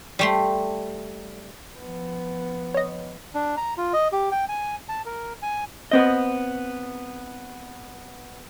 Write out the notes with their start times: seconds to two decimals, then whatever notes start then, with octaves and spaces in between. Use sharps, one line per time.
0.19 G3 A3 C6
1.78 F3 B3
2.74 C#5 D#5
3.34 D4
3.57 A#5
3.77 F4
3.93 D#5
4.12 G4
4.32 G5
4.49 G#5
4.89 A5
5.06 A#4
5.42 G#5
5.91 B3 C4 D#5